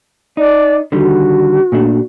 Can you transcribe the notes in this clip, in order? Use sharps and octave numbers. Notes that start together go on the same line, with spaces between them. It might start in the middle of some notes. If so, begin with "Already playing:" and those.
D#4 D5
D3 D#3 G3 F#4
A#2 A3 D4